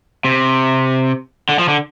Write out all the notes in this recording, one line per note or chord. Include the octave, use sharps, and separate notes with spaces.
C3
D3
F3
D3